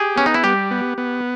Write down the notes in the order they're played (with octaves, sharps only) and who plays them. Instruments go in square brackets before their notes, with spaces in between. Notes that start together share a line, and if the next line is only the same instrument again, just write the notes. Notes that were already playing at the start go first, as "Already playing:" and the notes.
Already playing: [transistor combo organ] G4 [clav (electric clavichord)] G#4
[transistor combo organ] B3 [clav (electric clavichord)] C#4
[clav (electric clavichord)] D#4
E4
[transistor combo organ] G3 [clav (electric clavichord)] G4
[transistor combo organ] B3
B3